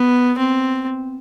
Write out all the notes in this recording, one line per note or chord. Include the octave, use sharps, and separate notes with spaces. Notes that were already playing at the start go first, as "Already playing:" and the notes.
Already playing: B3
C4